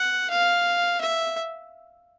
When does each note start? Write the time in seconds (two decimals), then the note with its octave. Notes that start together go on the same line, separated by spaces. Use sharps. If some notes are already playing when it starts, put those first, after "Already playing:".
Already playing: F#5
0.30 F5
1.01 E5